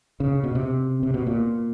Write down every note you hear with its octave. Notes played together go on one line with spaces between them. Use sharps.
C#3
B2
C3
C3
B2
A#2